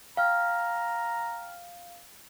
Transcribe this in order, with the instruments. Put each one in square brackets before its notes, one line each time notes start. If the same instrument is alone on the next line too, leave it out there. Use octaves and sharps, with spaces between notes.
[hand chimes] F5 [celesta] G5 F6 [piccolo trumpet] A#5